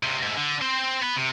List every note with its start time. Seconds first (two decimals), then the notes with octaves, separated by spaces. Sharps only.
0.03 C#2 C3
0.23 G#2 A3
0.36 D3
0.61 C4 C5
1.02 B3 B4
1.16 C3